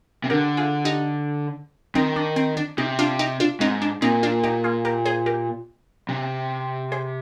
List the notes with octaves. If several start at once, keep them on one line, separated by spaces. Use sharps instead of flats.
C3
D3 G4 A#4
F4 G#4
D#4 G4
D#3 C4 D#4
D4
C4
D4
C3 D#4 G4
D4 F4
D#4 G4
D4 F4
G#2 C4 D#4
D4
A#2 C4 D#4
D4 F4
D#4 G4
F4 G#4
G4 A#4
G#4 C5
G4 A#4
C3
G#4 C5